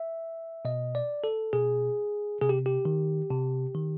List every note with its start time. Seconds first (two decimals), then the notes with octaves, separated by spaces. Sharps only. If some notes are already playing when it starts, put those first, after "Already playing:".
Already playing: E5
0.65 B2 D#5
0.95 D5
1.24 A4
1.53 B2 G#4
2.41 C3 G#4
2.49 G4
2.66 G4
2.85 D#3
3.30 C3
3.74 D#3